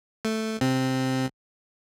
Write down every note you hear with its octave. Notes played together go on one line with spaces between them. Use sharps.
A3
C3 C4